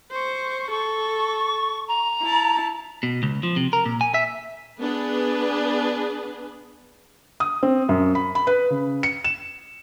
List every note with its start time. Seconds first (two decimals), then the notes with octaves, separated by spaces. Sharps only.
0.11 C5 C#6
0.71 A4 C#6
1.88 A#5
2.22 E4 A5
3.03 B2
3.23 C#2
3.43 F3
3.56 C3
3.73 A#4
3.86 A#2
4.01 G#5
4.14 E5
4.80 B3 D4 G#4 B4
7.40 D#6
7.63 C4
7.89 F#2
8.15 B5
8.35 B5
8.47 B4
8.70 C#3
9.03 C#7
9.24 E7